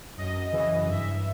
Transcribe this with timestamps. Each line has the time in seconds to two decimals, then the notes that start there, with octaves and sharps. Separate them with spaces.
0.18 F#2 D#5
0.52 C#3 E3
0.87 G2 E5